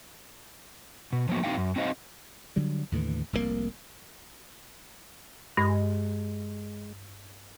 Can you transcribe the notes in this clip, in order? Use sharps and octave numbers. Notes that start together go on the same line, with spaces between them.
B2
F3 F#3 A#3 B3 D#4 F#4
C4 D4 D#4 F#4 F5 G5
F#2
C4 D#4 F#4 C5 D#5 F5
D3 F#3 G3
D#2 A2 D3 E3
F1 C2 C3 A#3
G2 G#3